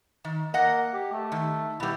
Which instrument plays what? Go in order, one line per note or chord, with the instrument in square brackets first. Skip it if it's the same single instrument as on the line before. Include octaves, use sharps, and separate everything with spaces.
[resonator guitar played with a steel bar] D#3
[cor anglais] A#3 [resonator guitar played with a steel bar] D#5 F#5
[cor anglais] G4
A3
[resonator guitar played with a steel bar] D#3
[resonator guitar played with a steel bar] B2 G3 [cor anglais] E4